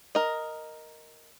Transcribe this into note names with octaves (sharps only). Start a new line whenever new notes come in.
A#4 D#5